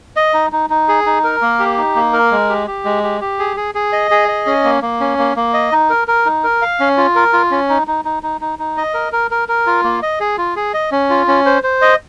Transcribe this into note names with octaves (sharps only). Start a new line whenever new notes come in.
D#5
D#4
D#4
D#4
G#4
D#4
A#4
A#3
G4
D#4
A#3
A#4
G#3
G4
G4
G#3
G4
G4
G#4
G#4
G#4
D#5
G#4
D#5
C#4
A#3
A#3
C#4
A#3
A#3
D#5
D#4
A#4
A#4
D#4
A#4
F5
C#4
F4
A#4
F4
C#4
D#4
D#4
D#4
D#4
D#4
D#4
D#5
A#4
A#4
A#4
A#4
F4
A#3
D#5
G#4
F4
G#4
D#5
C#4
F4
C#4
C5
C5
D#5